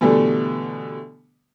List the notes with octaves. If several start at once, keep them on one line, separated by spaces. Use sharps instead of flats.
B2 D3 E3 G3 A3